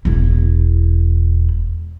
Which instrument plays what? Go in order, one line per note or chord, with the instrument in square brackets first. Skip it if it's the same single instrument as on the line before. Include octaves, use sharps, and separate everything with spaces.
[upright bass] E1 E4